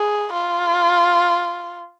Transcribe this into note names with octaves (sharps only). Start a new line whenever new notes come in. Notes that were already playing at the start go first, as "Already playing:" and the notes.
Already playing: G#4
F4